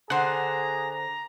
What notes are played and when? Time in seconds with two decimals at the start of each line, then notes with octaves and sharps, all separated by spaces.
0.10 D3 G#4 C5 F#5 A#5
0.91 A#5